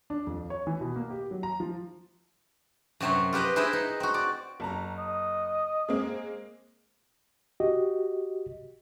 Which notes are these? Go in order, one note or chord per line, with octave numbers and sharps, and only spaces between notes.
D4
F2
C#5
E3
B2
A#3
G4
F#3
A#5
F3
F#2 C3 F#3 C5 C#5
F4 G4 B4 C5 D#5
E4 G#4 B4 C5 D#5 E5
D#4
C4 F#4
D5
F#1 A5 A#5
D#5
G#3 A#3 C4
F#4 G4 D#5